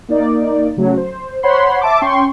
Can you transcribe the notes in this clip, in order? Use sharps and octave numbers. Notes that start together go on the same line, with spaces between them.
A#3 D#4 D5
C#3 F#3 A3
C5
C5 C#5 F#5 B5 C6
E5 A5 D6
C#4 G5 C6 C#6